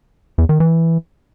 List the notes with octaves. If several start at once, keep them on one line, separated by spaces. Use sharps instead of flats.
E2
D#3
E3